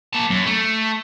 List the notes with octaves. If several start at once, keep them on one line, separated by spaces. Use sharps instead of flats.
A#3 A5
F#2
A3